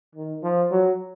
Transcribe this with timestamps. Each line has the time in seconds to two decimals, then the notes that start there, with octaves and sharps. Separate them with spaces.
0.15 D#3
0.43 F3
0.71 F#3